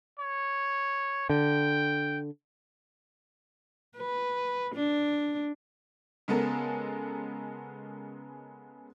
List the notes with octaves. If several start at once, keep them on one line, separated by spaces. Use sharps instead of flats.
C#5
D3 G5
B4
D4
C#3 G#3 B3 A4 A#4